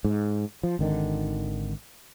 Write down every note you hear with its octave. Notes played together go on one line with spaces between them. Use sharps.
G#2
F3
G#1 D3 D#3